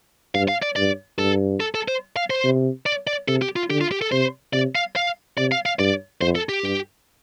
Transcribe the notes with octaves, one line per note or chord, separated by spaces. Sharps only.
G2 F5
F5
D5
G2 D5
G2 A4
A4
A4
C5
F5
C5
C3
D5
D5
C3 A4
G4
F4
D3 G4
F4
G4
A4
C3 C5
C3 D5
F5
F5
C3 D5
F5
F5
G2 D5
F2 C5
A4
G4
G2